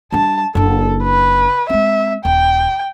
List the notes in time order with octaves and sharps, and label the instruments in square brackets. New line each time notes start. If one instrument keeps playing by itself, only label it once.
[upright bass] G3 D4 [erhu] A5
[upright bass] F#1 D4 [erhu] A4
[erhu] B4
[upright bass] G#3 C4 [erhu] E5
[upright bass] D#1 [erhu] G5